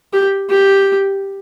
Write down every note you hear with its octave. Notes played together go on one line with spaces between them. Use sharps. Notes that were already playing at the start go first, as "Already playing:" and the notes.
G4
G4